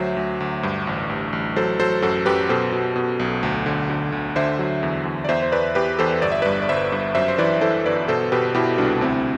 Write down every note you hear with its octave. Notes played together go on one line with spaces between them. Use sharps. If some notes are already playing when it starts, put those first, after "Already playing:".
Already playing: D2 F#3 C5 E5
D2
D2
G2
A1
A1
A1
F#3 A4 C5
F#3 A4 C5
F#2 F#4 A4
F#2 G4 B4
B2 A4 C5
B2
B2
B1
D2
D3
D3
D2
D3 C5 E5
F#3
E2
E2
D5
E2 C5 E5
C5
E2 B4 D5
E2 G4 B4
E2 A4 C5
G1 D5
E5
G2 B4 D5
D5
G1 C5 E5
G2
F#2 C5 E5
C5
E3 B4 D5
E3 A4 C5
G1 B4 D5
B2 A4 C5
B2 G4 B4
B2 E4 G4
C2 D4 F#4
D2 C4 E4